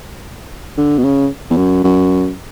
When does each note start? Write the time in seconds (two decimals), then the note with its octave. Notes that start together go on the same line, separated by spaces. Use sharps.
0.78 D3
0.98 B2
1.04 C#3
1.50 E2
1.57 F#2
1.84 F#2